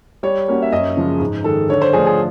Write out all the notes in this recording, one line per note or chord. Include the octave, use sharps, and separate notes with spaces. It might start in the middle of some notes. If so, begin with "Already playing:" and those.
G3 C#5
A#3 C#4 F#4
E5
F#2 D#5
C#3 F3 G#3
G#2
D#3 G#3 A4
D3 C#5
C5
F3 A3 D4 F4 G#4
G#4